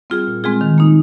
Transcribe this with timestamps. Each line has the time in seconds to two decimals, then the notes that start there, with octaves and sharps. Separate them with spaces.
0.10 G3 C4 F4 G#4
0.27 A#2
0.44 G#3 C4 F4 G#4
0.61 D#3
0.78 A#3 D#4